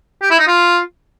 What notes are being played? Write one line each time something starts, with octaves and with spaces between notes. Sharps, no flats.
G4
E4
D#4
F4